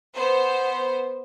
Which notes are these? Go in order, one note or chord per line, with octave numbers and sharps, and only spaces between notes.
B3 C5